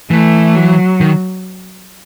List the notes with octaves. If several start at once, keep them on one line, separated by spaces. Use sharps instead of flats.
E3 A3
F#3
D#3